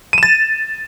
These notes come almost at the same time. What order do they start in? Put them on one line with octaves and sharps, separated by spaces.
D#7 E7 A6